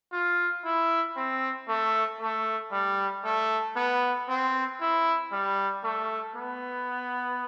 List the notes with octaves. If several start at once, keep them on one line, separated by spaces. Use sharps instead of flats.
F4
E4
C4
A3
A3
G3
A3
B3
C4
E4
G3
A3
B3